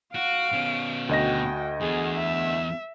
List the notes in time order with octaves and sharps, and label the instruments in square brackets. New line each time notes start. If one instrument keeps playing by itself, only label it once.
[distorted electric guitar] F#4 [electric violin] F5 D7
[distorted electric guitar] B2 C#4
[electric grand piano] D2 D#5 A#6 [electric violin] F#4 G5
[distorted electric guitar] E2 [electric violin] G#4
[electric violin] E5